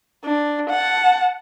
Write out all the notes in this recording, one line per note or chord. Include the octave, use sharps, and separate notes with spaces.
D4
F#5 A5